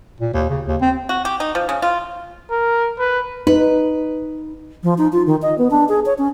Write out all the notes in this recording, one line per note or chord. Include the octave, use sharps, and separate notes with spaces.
A#2
D#2
C#3
D#2
C4
F#4
G4
D#4
F3
C#3
F4
A#4
B4
D#4 B4
F3
D#4
F4
D#3
D#5
B3
D4
G#4
C#5
C#4